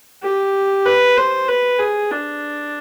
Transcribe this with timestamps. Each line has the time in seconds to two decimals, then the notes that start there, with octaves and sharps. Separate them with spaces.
0.23 G4
0.86 B4
1.17 C5
1.48 B4
1.79 G#4
2.11 D4